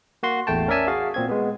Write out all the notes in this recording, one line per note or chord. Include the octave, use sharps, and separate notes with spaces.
A#3 F#4 C6
A1 E2 A3 G5 A5
C#4 A#4 D5 E5 G#5 A5
F#4 G#4 F5
A#2 C4 G#6
G#3 B3